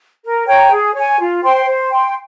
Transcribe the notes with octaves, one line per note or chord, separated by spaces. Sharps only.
A#4
C#5 G5 A#5
G#4
C#5 G#5
F4
C5 G5 C6
C5
G5 C6